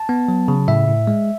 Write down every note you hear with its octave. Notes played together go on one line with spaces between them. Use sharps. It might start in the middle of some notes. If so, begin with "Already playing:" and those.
Already playing: A5
B3
F#3
C#3
A2 E5
A2
G#3